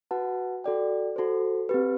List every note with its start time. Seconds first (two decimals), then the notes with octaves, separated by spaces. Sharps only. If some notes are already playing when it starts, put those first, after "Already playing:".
0.11 F#4 B4 F#5 A5
0.64 F#4 A4 D5 G5
1.16 F#4 A4 C5
1.69 C4 G4 B4